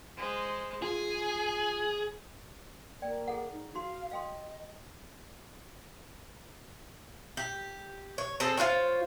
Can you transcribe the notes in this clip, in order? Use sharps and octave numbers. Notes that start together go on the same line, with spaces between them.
G#3 C5
F4 G#4 G#5
A#3 D5 G5
G#4 A4 F#5
D#4
F#4 F5 C6
D#5 F5 G5 C6
G4
C#5
C4 G#4 A4
F4 F#4 C5 C#5